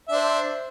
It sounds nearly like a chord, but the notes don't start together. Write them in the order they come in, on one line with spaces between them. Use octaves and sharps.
E5 D4 C5